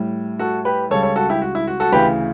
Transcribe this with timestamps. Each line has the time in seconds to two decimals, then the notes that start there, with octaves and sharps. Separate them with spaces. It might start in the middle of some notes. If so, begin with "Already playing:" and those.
Already playing: A2 G3
0.39 F#4 A4
0.65 G4 B4
0.90 C#2 C#3 G3 A4 C#5
1.03 A4 C#5
1.16 F#4 A4
1.29 E4 G4
1.42 F#4
1.55 E4
1.67 F#4
1.80 F#4 A4
1.92 D2 C#3 E3 G4 B4